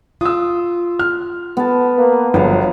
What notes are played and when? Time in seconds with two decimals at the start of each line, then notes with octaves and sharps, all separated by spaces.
0.21 F4 D#6 E6
0.99 F6
1.57 B3 A5
1.97 A#3 B4
2.34 G1 F3 F#3 B4 C#5 A#5